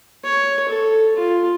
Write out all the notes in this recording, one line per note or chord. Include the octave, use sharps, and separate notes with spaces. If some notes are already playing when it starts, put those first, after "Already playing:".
C#5
A4
F4